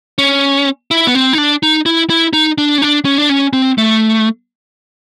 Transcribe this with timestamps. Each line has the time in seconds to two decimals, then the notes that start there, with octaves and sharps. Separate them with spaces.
0.18 C#4
0.91 E4
1.07 B3
1.15 C4
1.33 D#4
1.38 D4
1.63 D#4
1.86 E4
2.10 E4
2.33 D#4
2.58 D4
2.78 C#4
2.82 D4
3.05 C#4
3.18 D4
3.29 C#4
3.53 C4
3.78 A3